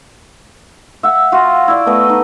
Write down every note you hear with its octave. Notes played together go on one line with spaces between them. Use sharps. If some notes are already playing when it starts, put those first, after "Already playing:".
E5 F#5
F4 F#4
E4 D5
A3 B3 B4 D#5
D#4